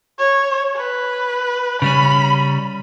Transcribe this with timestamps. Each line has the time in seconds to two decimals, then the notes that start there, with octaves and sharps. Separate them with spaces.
0.19 C#5
0.77 B4
1.82 C#3 G3 C#4 B5